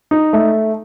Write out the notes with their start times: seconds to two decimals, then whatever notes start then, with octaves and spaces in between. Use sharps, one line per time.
0.11 D#4
0.33 A3